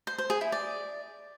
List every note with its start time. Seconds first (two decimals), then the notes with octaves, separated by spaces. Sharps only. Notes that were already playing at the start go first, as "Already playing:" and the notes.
0.07 C5
0.18 C5
0.30 G#4
0.41 E4
0.52 D5